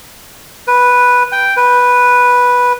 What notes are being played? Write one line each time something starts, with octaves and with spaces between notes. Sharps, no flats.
B4
G5
B4